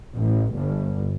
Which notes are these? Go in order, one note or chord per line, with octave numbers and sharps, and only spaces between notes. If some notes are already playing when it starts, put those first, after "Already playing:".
A1
G1